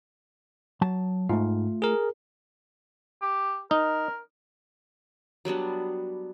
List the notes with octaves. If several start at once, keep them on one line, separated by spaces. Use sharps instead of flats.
F#3 A5
G#2 A3 F4
G#4 A#4
G4
D#4 A#4
F#3 G3 B3 D4